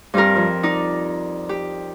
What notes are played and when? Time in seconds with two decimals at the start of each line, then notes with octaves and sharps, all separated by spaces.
0.14 G2 C4 G4 A#4
0.36 F2
0.63 D#4 D5
1.49 G4